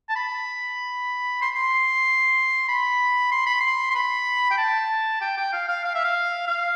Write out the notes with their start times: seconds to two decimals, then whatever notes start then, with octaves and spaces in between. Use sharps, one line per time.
0.09 A5
0.16 B5
1.42 C6
1.56 C6
2.69 B5
3.31 C6
3.46 B5
3.60 C6
3.90 C6
3.95 B5
4.51 G5
4.58 A5
5.21 G5
5.37 G5
5.53 F5
5.68 F5
5.85 F5
5.95 E5
6.04 F5
6.48 F5